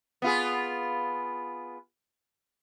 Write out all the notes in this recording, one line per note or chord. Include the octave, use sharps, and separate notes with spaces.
B3 F4 G#4